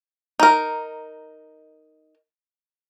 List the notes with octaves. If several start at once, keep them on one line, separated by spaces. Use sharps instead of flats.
D#4 A#4